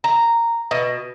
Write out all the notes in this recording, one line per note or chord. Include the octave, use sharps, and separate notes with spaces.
A#5
B2